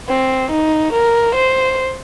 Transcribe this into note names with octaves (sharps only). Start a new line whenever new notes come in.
C4
D#4
A#4
C5